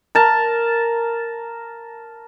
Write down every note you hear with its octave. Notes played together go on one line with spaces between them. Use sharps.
A#4 A5